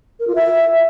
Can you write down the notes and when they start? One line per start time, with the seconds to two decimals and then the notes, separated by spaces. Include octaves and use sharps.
0.20 A#4
0.28 F4
0.35 E5